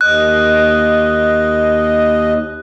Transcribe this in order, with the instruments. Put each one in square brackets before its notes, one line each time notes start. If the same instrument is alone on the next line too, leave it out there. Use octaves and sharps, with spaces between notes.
[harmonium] D#2 D#5 [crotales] F#6